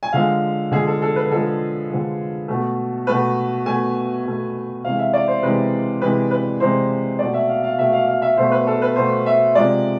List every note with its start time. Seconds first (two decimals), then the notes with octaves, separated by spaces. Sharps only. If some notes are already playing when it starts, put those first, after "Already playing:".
0.03 G#5
0.13 D3 F3 G#3 F5
0.71 D3 F3 G#3 G#4
0.87 A4
1.02 A4
1.16 B4
1.31 D3 F3 G#3 A4
1.90 D3 F3 G#3
2.48 B2 A3
3.07 B2 A3 B4
3.66 B2 A3 G#5
4.26 B2 A3
4.84 C3 E3 G#3 F5
4.99 E5
5.13 D5
5.28 C5
5.42 C3 E3 G#3 B4
6.02 C3 E3 G#3 B4
6.31 B4
6.60 C3 E3 G#3 C5
7.19 B2 A3 D5
7.34 E5
7.49 F5
7.64 F5
7.79 B2 A3 E5
7.93 F5
8.08 F5
8.22 E5
8.37 B2 A3 C5
8.52 B4
8.67 A4
8.82 B4
8.96 B2 A3 C5
9.26 E5
9.55 C3 F3 G#3 D5